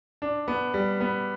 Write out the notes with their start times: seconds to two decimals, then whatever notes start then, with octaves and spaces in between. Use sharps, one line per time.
0.22 D4
0.48 B3
0.74 G3
1.00 B3